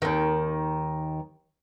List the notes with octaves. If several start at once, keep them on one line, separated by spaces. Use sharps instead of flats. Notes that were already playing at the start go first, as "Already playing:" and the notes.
D#2 D#3